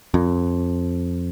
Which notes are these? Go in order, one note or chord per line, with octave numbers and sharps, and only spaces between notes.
F2